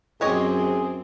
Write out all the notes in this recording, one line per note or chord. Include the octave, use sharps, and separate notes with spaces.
F#2 C4 G4 G#4 C#5 D#5